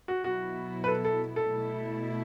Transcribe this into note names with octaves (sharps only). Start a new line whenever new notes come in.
F#4
B2 F#3 B3 E4 F#4
B4
A4
A4
A4
B2 A3 E4